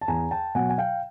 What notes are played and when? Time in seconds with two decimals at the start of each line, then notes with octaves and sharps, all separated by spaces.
0.01 A5
0.08 E2 G#5 A#5
0.31 G5 A5
0.55 B2 F#3 F#5 G#5
0.70 G#5
0.78 F5 G5